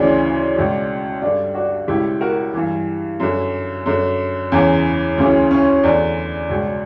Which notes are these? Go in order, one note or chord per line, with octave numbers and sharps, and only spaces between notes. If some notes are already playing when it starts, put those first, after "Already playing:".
Already playing: D2 C#3 E3 D4
C#2 B2
G2 D3 D4
D4 F#4
C#2 B2 E4 G4
F#4 A#4
G2 E3
F#2 D3
F#2 D3
E2 C#3 E3
D2 C#3 E3
C#4
E2 D3 D4
C#2 B2